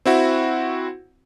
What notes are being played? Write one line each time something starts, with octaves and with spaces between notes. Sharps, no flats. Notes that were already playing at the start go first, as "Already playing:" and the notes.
C4 E4 F#4